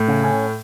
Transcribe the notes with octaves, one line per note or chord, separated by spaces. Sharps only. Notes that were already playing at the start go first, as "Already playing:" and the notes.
Already playing: A2
C#3
C#4